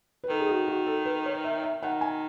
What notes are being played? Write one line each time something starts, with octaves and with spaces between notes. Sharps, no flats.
B4
D#3 A4
G#4
F#4
F#4
A4
B4
C#5
E5
E5
D#3 F#5
G#5